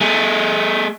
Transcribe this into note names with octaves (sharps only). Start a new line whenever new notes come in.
A3 G#4